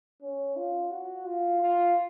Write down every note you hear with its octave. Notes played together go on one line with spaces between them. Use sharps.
C#4
F4
F#4
F4
F4